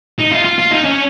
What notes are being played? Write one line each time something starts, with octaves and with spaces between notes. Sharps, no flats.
D#4
F4
F4
F4
D#4
C#4